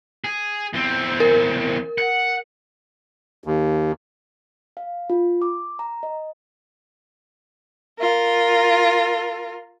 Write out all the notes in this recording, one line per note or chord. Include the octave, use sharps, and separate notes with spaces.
G#4
E2 C4
A#4
F#5
D#2
F5
F4
D6
A#5
D#5
F4 A#4